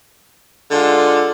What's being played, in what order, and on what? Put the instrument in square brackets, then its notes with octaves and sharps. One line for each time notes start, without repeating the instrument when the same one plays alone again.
[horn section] D3 G#3 D4 F4 A4